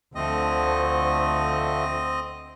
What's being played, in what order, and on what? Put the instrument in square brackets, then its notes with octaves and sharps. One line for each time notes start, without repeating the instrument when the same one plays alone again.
[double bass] D2 [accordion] D3 F3 A3 [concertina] C4 D#5